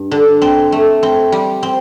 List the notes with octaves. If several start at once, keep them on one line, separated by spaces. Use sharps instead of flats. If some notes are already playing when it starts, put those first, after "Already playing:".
Already playing: G2
D3
C4
A3
C4
G3
C4